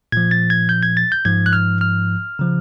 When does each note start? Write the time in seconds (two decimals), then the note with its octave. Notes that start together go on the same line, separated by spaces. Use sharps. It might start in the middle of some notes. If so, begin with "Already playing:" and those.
0.12 A#2 F3 G#6
0.31 A6
0.50 G#6
0.69 G6
0.83 G#6
0.97 A6
1.12 G6
1.25 G#2 F3 G#6
1.46 F#6
1.53 F6
1.81 F6
2.39 C#3 F3